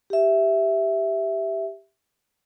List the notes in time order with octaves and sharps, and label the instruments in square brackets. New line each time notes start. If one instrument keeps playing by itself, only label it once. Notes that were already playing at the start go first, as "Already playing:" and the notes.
[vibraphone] G4 E5